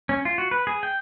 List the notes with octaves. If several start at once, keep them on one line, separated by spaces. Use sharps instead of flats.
C#4
F4
F#4
B4
G#4
G5